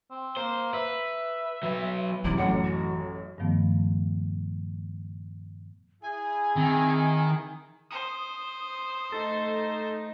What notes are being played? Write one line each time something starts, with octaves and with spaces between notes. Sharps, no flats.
C4
A#3 C5
B4 E5
F#3 B4
F#2 C3 E3 E4 D6
A1 F#2 A2 F#5
F#4
G2 A#2 D#3 F3 A3 B3
E4 G#4 G#5
D#3 C4
C5 D#6
A3 D#4 A4